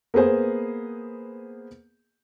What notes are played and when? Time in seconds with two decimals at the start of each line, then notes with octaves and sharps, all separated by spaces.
0.14 A#3 B3 G#4 C5